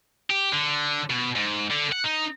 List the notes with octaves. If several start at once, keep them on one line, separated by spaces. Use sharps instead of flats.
G4
D3
B2
G#2
D3
F#5
D#4